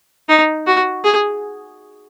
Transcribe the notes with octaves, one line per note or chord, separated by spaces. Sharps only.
D#4
F#4
G#4